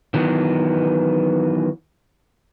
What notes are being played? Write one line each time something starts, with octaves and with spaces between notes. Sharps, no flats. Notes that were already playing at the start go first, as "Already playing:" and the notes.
D#3 E3 F#3 B3